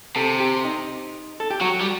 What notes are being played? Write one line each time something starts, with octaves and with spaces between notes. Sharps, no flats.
C3 A4
G4
D#4
A4
G4
F#3 F#4
G3